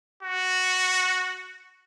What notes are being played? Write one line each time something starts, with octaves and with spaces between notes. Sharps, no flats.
F#4